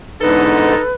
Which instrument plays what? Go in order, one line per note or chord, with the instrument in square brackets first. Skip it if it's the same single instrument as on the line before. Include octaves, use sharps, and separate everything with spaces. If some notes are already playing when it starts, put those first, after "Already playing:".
[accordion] E2 G#2 D3 [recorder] D#4 [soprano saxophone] A4 [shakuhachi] B4